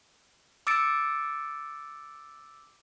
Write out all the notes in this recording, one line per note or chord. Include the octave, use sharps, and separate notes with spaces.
D6 E6 A6 C#7 D7